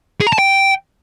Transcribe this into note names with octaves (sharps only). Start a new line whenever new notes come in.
G#4
A#5
A5
G5